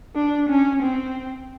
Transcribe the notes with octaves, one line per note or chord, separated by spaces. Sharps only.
D4
C#4
C4